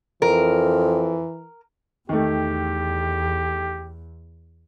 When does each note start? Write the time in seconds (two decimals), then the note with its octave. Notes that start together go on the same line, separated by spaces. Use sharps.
0.22 F2 E3 A#4
2.09 E2 D#3 A3 G4